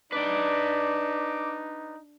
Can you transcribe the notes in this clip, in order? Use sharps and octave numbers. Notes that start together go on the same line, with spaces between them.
D4 D#4 B4 D5 D6